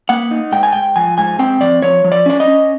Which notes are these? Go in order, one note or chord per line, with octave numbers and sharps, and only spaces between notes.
A#3 F#5
D#4
G#2 G5
G#5
G#2 G5
F3 G#5
G#2 G#5
C4 G5
F3 D5
F3 C#5
F3
D5
C#4 D5
D#5
C#4